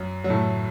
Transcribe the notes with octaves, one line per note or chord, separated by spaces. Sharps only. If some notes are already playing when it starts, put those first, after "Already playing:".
Already playing: F#2 F#3
F#3
A2 A3